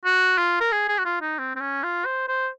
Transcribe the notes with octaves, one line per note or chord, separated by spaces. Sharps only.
F#4
F4
A#4
G#4
G#4
F#4
F4
D#4
C4
C4
C#4
F4
C5
C5